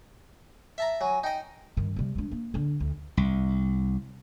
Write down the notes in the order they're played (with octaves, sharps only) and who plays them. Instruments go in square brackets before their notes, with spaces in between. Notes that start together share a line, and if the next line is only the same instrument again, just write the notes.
[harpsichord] E5 A5 A#5
[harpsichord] F#3 [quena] G#5
[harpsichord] D#4 D#5 [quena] G5
[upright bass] G2 D#3
C3 G3
G#3 D4
A#3
D3 D4
D2
[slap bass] C2